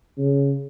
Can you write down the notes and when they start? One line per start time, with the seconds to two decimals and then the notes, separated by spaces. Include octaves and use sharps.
0.17 C#3